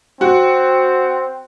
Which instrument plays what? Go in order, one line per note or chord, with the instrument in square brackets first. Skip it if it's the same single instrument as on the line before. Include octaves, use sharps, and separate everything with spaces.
[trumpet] C4 [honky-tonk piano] F#4